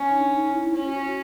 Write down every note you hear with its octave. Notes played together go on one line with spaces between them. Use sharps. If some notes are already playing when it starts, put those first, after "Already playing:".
Already playing: C#4
D#4
D4
D#4
E4
C#4
F#4